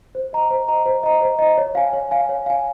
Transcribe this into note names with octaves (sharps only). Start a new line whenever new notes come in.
C5
D#5 A#5
C5
D#5 A#5
C5
D#5 A#5
C5
D#5 A#5
C#5
F5 G#5
C#5
F5 G#5
C#5
F5 G#5